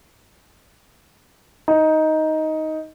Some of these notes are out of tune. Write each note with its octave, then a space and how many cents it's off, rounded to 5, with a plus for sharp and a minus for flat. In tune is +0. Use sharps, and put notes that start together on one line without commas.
D#4 +10